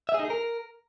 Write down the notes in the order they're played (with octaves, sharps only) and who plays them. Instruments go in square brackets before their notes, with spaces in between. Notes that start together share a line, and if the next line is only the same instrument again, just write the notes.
[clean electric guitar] E5
G#4
D#4
G#4
A#4